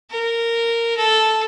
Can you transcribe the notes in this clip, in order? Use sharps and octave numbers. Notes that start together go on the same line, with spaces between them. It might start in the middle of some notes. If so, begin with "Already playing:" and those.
A#4
A4